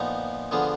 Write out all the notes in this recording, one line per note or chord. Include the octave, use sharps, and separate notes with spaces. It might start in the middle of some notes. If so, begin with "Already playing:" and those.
Already playing: A#2 F3 B3 D#4
D3 F3 B3 F4 G#4